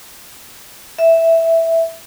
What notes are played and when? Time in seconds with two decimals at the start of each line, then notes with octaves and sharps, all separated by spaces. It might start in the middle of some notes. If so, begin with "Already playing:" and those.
0.99 E5